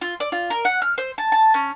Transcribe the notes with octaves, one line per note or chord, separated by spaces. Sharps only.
F4
D5
F4
A#4
F#5
F6
C5
A5
A5
C#4